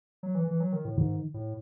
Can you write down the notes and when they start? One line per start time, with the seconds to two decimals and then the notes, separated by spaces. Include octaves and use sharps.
0.23 F#3
0.35 E3
0.48 E3
0.60 F#3
0.73 D#3
0.85 A2
0.97 G#2 D#3
1.34 A2